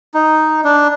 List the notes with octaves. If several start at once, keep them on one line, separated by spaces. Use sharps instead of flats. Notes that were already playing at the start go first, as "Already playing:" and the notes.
D#4
D4